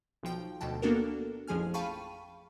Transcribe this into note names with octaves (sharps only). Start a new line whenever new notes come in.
B1 F3 G5
D2 B2 G5 A5
A#3 B3 D4 F#4 A4 A#4
A1 F2 F3 G#4 G#5 F6
F5 G5 A5 B5 C#6 D#7